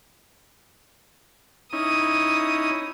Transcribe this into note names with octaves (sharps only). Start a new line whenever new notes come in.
C#4 D#4 E4 D#6